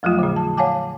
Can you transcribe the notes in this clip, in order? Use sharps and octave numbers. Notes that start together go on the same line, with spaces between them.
F2 F3 F#3 A3 F4
A#2 D3
A5
C#5 F5 F#5 G#5 A5 D6